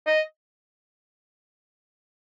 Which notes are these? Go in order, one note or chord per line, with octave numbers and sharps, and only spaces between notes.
D#5